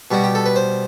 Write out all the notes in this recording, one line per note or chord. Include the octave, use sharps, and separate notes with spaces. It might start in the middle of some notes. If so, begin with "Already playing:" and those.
B2 G3 F#4
G4
A4
B4
C5